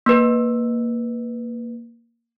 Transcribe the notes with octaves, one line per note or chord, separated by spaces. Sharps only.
A#3 B4